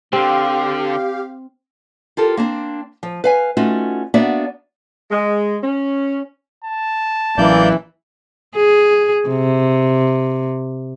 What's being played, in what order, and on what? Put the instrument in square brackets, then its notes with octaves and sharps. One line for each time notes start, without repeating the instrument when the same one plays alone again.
[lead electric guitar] D3 [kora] C4 [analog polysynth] G4 F5
[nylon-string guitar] F4 G4 A4 A#4
A#3 C4 D4
F3
B4 F5 G#5
A3 C#4 D#4 F4 F#4
A#3 B3 D4 F#4 D5 E5
[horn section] G#3
C#4
[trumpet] A5
[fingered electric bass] A1 F#3 C#4 [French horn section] E3 [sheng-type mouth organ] A#3 D5 G6
[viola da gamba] G#4
C3